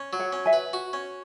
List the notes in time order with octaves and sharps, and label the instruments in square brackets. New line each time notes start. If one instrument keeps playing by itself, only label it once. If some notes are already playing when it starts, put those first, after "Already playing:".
Already playing: [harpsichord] C#4
F#3
[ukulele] C#5 F#5
[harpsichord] C#4
[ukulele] E5 G#5
[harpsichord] B4
F#4
C#4